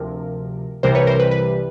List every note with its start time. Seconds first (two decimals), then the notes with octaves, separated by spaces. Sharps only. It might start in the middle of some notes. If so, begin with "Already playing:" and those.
Already playing: D2 C3 F3 A#4
0.83 C2 C3 E3 G3 A#4 C5
0.95 B4 C#5
1.07 A#4 C5
1.20 B4
1.31 B4